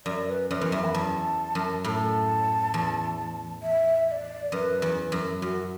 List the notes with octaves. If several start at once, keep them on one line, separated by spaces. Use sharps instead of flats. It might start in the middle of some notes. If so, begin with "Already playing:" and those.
F#2 D5
B4
F#2 B4 D5
E2
F#2 E5
B5
E2 A5
F#2
A2 A5 B5
E2
E5
E5
D5
F#2 B4
E2
F#2
F#2 F#4